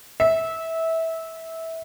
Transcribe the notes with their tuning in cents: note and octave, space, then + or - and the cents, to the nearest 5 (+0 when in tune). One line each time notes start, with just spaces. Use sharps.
E5 -20